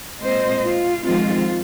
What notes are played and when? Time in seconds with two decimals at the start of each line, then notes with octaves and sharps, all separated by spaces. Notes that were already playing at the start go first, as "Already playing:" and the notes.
0.21 A#2 G#3 C4 C5 D#5
0.63 F4
1.04 F2 D#3 G#3 C4 F4